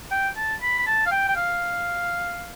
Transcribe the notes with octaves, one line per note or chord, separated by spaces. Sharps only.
G5
A5
B5
B5
A5
F5
G5
G5
F5